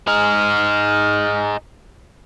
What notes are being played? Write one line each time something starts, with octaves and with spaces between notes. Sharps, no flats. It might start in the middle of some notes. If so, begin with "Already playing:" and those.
D#4 G#4 F6